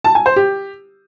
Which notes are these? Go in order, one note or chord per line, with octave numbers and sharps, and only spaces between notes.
A5
G#5
C5
G4